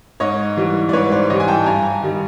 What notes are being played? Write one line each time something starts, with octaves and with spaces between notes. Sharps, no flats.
G#2 C#5 D#5
E3 G3
D5
G#2 B4 C#5
C5 D5
E3 G3 C#5 D#5
G#5
G5 A5
G2 G#5 A#5
D#3 G3